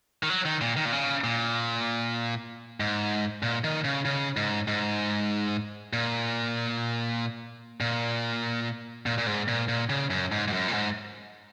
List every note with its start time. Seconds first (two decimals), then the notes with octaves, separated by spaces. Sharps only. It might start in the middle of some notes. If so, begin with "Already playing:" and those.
0.23 D#3
0.30 F#3
0.45 D#3
0.61 A#2
0.77 D#3
0.85 A#2
0.93 C#3
1.24 A#2
2.80 G#2
3.43 A#2
3.64 D#3
3.85 C#3
4.05 C#3
4.37 G#2
4.68 G#2
5.93 A#2
7.81 A#2
9.06 A#2
9.18 A#2
9.27 G#2
9.48 A#2
9.68 A#2
9.90 C#3
10.10 F#2
10.32 G#2
10.48 G#2
10.53 F#2
10.68 A#2
10.73 G#2